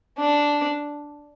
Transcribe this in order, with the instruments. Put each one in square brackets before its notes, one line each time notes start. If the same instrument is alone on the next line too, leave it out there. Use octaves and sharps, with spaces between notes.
[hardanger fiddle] D4